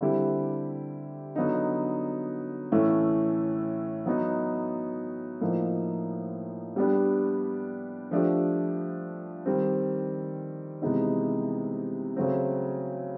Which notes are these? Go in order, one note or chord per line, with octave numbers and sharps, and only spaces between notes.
D3 G3 C4 E4 G4
D3 F#3 B3 D#4
A2 E3 A3 C#4
F#3 B3 D#4
A2 F3 A#3 D#4
G3 B3 D4 G4
F3 A3 D4 G4
D#3 G3 C4
C3 E3 G#3 B3 D#4
C#3 F#3 A3 C4